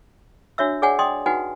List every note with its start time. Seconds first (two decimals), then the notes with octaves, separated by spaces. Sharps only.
0.58 D4 F#4 C#5 E5 E6
0.82 G#4 C#5 D5 F#5 G#5
0.99 D5 D#5 G5 C6 D#6
1.26 D#4 F#4 B4 F#5 G#5